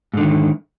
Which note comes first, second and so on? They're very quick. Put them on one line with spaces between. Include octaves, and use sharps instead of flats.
G#2 D3 D#3